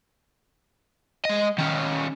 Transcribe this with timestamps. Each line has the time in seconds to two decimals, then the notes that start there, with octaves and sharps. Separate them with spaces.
1.25 G#3 D#5
1.58 D#3 C#4